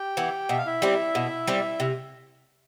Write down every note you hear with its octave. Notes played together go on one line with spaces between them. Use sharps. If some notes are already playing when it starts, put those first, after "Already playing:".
Already playing: G4 G5
E3 B3
B2 E5
F5
E4 E5
G3 C4
B2
G3 C4
C3